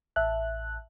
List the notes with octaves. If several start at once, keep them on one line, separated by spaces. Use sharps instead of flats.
A1 E5 A5 F#6